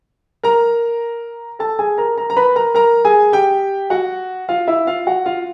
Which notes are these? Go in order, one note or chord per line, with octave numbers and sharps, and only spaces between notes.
A#4 A#5
A4 A5
G#4 G#5
A#4 A#5
A#4 A#5
A#5
B4 B5
A#4 A#5
A#4 A#5
G#4 G#5
G4 G5
F#4 F#5
F4 F5
E4 E5
F4 F5
F#4 F#5
F4 F5